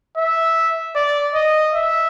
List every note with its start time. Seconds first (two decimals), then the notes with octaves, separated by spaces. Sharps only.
0.18 E5
0.96 D5
1.35 D#5
1.74 E5